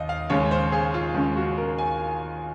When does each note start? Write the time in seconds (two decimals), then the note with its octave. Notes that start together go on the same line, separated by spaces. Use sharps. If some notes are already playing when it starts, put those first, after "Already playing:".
Already playing: D#2 D#5
0.09 F5
0.30 D#2 C#3 G#3 C#4 C#5
0.51 C5
0.72 G#4
0.94 F4
1.15 D#2 C#3 G#3 C#4
1.37 F#4
1.58 A#4
1.78 G#5